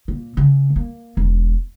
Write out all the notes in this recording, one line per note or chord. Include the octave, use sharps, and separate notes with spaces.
A#2
C#3
A#3
E1